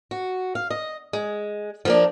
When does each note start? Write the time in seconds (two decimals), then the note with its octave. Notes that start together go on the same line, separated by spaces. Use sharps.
0.11 F#4
0.55 F5
0.70 D#5
1.13 G#3
1.85 F3 A#3 D4